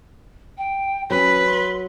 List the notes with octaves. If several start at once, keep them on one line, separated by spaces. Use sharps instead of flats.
G5
F#3 C#4 B4
C6